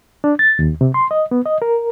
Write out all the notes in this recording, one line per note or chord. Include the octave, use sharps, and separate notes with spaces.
D4
A6
D#2
C3
C6
D#5
B3
D#5
A#4